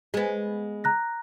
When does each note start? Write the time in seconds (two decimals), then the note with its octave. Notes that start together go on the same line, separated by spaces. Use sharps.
0.14 G#3 B3
0.84 A#5 F#6 A#6